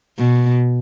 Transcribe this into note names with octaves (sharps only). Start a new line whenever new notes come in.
B2